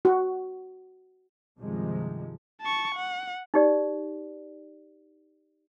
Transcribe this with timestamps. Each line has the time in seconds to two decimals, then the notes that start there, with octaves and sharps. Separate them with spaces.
0.05 F#4
1.59 G2 C3 D#3 F3 G#3
2.61 A5 C#6
2.95 F#5
3.54 D#4 G4 D5